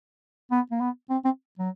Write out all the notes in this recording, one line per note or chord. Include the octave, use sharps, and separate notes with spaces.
B3
A#3
B3
C4
C4
F#3